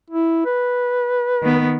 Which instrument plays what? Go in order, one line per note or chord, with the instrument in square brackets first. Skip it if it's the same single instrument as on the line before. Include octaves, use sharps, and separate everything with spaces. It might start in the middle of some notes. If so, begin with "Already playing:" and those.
[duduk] E4
B4
[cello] D#3 B3